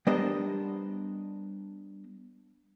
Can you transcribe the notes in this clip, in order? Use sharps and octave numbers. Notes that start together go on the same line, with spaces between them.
G3 B3 D4 A#4 C5 D#5